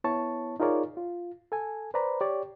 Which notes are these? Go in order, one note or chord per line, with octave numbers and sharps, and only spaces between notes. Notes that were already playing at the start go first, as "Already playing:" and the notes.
B3 E4 C#5 A5 C#6
D#4 F4 G#4 A#4 C#5 D5
F4
A4 G#5
B4 C5 D5 A#5 B5
G4 C#5 D5